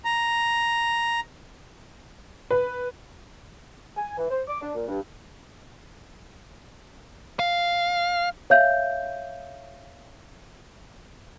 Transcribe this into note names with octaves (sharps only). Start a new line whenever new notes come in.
A#5
B4
G#5
E3
C5
D6
D4
A#2
G2
F5
C#5 E5 F5 G6